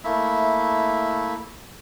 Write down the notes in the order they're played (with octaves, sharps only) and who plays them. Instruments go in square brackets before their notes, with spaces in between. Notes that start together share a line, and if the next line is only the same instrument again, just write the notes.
[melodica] A3 A#3 E4 E5